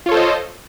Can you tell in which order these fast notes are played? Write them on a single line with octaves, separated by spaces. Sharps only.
F4 C#5 A4 C5 D#5